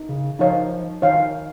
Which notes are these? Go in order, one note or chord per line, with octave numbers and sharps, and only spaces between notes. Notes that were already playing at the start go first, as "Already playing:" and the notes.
Already playing: D#4
C#3
F3 D#4 C#5 F5
D#3 D#4 C#5 F5